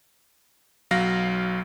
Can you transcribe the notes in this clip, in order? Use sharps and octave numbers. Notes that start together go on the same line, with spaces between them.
B1 F#3 F5 A#6